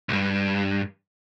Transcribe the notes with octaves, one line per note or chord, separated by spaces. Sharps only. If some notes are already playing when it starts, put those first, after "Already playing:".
C2 G2